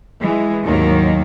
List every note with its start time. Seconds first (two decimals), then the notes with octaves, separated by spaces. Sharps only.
0.21 E3 G#3
0.63 D#2 G#2 D#3 F#3 A#3